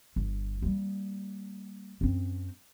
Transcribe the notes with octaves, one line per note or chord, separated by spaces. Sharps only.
G1
G3 A#3
F#2 C4